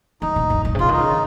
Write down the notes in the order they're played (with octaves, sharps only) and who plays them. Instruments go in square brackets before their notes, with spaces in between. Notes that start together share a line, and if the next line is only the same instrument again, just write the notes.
[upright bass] D#3 [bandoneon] D#4
[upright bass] A#2
F#2
A#2
C3
[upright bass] C#3 [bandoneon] F4
[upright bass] D#3
[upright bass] C#3 [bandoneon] D#4